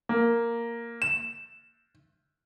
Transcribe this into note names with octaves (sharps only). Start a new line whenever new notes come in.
A#3
E7